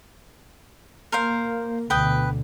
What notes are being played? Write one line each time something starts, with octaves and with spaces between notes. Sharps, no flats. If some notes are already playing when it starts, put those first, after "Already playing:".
A#3 A#4 C5 F5
D2 B2 D3 B4 G5 D#6